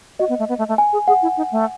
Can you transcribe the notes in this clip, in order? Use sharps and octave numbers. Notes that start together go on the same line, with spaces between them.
F#4 D#5
B3
A3
B3
A3
A3
G#5
G#4
G#4 F#5
E4
D#4
A3